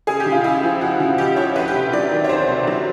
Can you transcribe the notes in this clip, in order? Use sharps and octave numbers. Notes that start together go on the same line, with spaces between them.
C#2 G#4
G4
C#3
F4
C#2 E4
F3
C#2 F#4
C#3
C#2 G4
F3 C#5
D2 B4
G4
C3
F#3 D5
D#3
C#5
D2 C5
C3
F#3